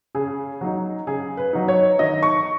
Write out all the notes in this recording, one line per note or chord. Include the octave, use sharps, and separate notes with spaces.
C#3 G#4
F#3 D#4
C#3 G#4
B4
F#3 D#4
C#5
D#3 D#5
C#6